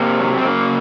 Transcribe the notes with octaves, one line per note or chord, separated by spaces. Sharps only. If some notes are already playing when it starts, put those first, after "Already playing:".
Already playing: C3 A#3
F#3
C4
C#3 A#3